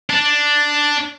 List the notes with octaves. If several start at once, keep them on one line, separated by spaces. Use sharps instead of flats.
D4